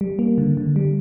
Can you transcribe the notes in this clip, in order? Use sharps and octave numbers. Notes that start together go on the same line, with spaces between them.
G3
A#3
D3
D3
G3